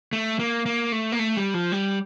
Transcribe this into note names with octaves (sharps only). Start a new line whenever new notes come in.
A3
A#3
A#3
A3
A#3
A3
G3
F3
G3